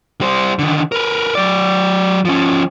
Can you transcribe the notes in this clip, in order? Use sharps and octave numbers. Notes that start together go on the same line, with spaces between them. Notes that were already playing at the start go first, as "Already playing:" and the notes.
G3 C5
D3 D#3
A#4 B4
F#3 D5
F3 C#4